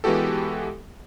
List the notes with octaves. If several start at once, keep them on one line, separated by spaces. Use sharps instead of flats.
E3 G#3 B3 F#4 G4 A4